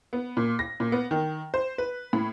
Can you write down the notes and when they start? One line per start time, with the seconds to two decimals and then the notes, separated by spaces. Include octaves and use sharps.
0.13 B3
0.37 A#2
0.59 A#6
0.80 A#2
0.92 B3
1.11 D#3
1.54 C5
1.78 B4
2.13 A2